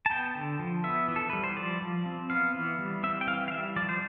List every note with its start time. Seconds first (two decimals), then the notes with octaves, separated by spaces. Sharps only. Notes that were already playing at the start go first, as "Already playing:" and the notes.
0.06 A5
0.10 B3 G5
0.35 D3
0.59 F3
0.84 B3 E5
1.08 E3
1.16 A4
1.30 G3 B4
1.44 C5
1.57 F3 D5
1.82 F3
2.06 C4
2.30 B3 F5
2.55 E3
2.79 G3
3.03 C4 E5
3.21 G5
3.27 E3 F5
3.48 F5
3.52 G3 E5
3.76 F3 D5
3.89 C5